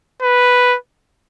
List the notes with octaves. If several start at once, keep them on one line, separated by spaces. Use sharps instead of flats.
B4